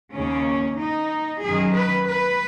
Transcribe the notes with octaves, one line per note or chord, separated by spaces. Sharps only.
D#2 C#3 C#4
D#4
F#2 D#3 G#4
B4
B4